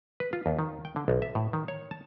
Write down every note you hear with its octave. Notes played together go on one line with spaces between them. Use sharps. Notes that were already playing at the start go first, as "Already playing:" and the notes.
B4
F4
D#2
D#3
G5
D3
B1
E5
A2
D#3
C#5
A5